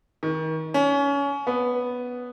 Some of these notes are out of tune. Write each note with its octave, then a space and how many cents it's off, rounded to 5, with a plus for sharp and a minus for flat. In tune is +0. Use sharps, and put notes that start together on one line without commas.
D#3 +30
C#4 +25
B3 +0